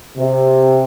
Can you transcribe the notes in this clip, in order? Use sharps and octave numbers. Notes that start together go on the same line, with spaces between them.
C3